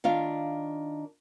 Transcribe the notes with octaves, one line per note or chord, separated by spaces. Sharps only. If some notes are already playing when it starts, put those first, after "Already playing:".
D#3 D4 F4 F5